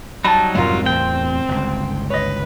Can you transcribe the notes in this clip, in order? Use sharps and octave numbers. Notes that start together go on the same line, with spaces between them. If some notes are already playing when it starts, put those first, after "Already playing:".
F#3 G3 D#4 A5 B5
F2 G#2 C3 G#3 F4 A#4
E2 A2 C4 G5
G1 C#2
B4 C#5 D#5